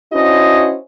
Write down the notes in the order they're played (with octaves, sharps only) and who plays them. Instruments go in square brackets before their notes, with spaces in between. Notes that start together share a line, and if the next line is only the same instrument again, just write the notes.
[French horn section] C#4 D4 E4 F#4 C5 D#5